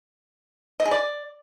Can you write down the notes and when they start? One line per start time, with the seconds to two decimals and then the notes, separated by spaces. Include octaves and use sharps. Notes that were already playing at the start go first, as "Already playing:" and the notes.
0.80 D#5
0.85 G#4
0.91 D5